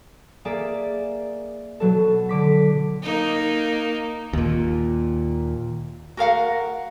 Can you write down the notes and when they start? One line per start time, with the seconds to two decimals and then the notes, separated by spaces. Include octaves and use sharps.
0.45 A#3 G#4 D5 E5
1.80 B2 F#3 A4
2.29 D3 D6 B6
3.03 A#3 D#4
4.33 D#2 A#2
6.17 F#4 A#4 F5 F#5